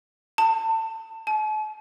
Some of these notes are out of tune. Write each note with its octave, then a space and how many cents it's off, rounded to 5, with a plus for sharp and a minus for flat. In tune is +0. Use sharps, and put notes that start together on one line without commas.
A5 +30
A5 -45